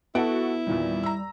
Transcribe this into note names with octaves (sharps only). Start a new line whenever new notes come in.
B3 E4 F#4 A4 F#5 D7
E2 A#2 D#3 G3
A#5 E6